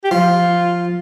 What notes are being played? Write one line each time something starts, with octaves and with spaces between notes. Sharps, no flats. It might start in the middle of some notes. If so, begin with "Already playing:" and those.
G4
F3 F4